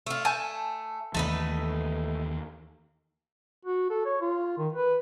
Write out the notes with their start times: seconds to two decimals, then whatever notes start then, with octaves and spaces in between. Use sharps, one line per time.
0.06 A3 F4
0.25 A3 G#5 A5 G6
1.14 D#2 E3 A3 D#4 B4
3.65 F#4
3.90 A4
4.06 C#5
4.21 F4
4.58 D#3
4.73 B4